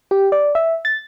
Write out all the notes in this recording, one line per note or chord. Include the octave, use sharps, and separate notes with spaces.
G4
D5
E5
A6